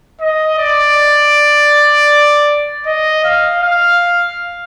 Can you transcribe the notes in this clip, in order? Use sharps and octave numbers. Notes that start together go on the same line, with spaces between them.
D#5
D5
D#5
F5
F5